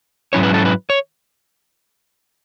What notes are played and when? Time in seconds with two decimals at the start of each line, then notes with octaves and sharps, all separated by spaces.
0.33 G#2 F#3 C#4 E4 C#5
0.43 B4
0.54 A4
0.65 B4
0.90 C#5